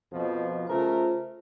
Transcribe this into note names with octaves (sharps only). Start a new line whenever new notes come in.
F2 B2 F3
C#3 A3 F4 A#4 C5